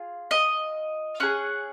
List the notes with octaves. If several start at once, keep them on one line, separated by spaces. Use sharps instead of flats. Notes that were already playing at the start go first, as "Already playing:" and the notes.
Already playing: F4 G#4
D#5
C#4 G#4 F#5